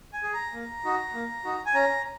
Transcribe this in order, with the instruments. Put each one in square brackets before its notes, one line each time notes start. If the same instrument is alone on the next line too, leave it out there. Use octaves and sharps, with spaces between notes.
[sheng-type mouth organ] G#5
G#4
A#5
A#3
D#4 F#4
A#3
D#4 F#4
G#5
C#4 A#5